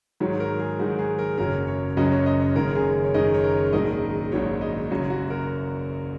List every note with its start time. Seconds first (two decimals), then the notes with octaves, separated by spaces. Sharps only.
0.20 G#2 D#3 F#3 C#5
0.40 A#4
0.60 G#4
0.79 G#2 D#3 F#3 F#4
0.99 G#4
1.19 A#4
1.37 F#1 F#2 F#3 C#4 A#4
1.67 C#5
1.97 F#1 F#2 F#3 C#4 D#5
2.12 C#5
2.26 D#5
2.41 C#5
2.56 F#1 F#2 D#3 G#3 C#4 A#4
2.75 G#4
3.04 C#5
3.14 F#1 F#2 D#3 G#3 C#4 D#5
3.34 C#5
3.44 A#4
3.54 C#5
3.73 A#1 G#2 D#3 F#3 D#5
4.32 A#1 G#2 D#3 F#3 C#5
4.61 D#5
4.90 F#1 F#2 F#3 C#5
5.10 F#4
5.30 A#4